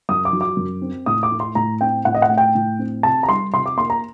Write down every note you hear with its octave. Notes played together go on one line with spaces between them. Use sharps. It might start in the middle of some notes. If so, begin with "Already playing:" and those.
F#2 D#6
D6
F#3
D6
F#2
C4
A2 D#6
D6
A3
C6
A2 A#5
C4 G5
A2 F#5
D#5
F#5
A3
G5
A2
C4
C3 A5
A#5
G3 C6
C3 C6
D6
A#3 C6
A#5